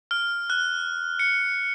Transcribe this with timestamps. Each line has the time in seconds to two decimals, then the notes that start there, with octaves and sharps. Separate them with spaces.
0.11 F6
0.50 F#6
1.19 C#7